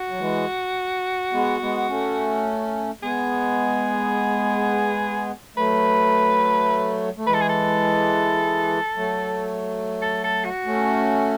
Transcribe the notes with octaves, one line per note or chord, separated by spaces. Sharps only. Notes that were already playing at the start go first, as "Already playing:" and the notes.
Already playing: F#4
F#3
E3 G#3
G#3 B3
G#3 B3
A3 C#4
G#3 B3 G#4
F#3 A3 B4
A3
E3 G#3 B4
A4
G#4
A4
F#3 A3
A4
A4
F#4
A3 C#4